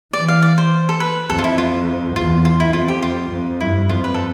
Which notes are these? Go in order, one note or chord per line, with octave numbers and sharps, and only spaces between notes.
E3 D5
F5
D5
C5
A4
B4
F2 A4
F4
E4
F4
E2 F4
F4
E4
F2 F4
G4
F4
F2
G2 E4
F2 F4
B4
A4